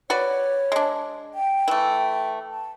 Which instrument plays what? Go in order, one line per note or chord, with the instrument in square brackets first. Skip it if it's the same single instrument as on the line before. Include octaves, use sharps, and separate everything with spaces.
[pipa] F#4 B4 D5 [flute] C#5
[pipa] G#3 D4
[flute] G5
[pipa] E3 A3
[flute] A5